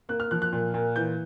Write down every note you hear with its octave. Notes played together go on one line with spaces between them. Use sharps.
A#3 F#6
F6
F3 F#6
F#6
A#2
A#2
E3 G6